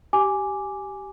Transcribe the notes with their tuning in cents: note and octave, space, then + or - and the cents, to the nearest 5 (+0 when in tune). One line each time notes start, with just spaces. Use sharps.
G4 -15 G#5 +0 D6 +0